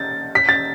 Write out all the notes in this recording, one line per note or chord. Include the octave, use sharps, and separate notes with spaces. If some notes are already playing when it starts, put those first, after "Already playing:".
Already playing: A6
B6
A6